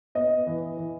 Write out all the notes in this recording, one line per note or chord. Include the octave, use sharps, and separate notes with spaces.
B3 D#5
E3
E3